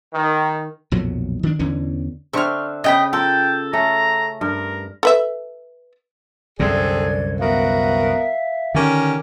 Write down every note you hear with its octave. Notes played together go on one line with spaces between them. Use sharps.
D#3
B1 F2 A#2 F#3
D#3 D4
E2 D3 E3 C#4
D3 C4 E5 C#6 F6
C#3 D#5 G5 B5
F4 A4 A#4 G5
A3 C#4 A#5
G2 A#4
A4 B4 E5
C2 F#2 D3 C4 G#4 A4 D5 G#6
B3 F#4 A#4 E5 F5
D3 D#3 C#4 G4 A#4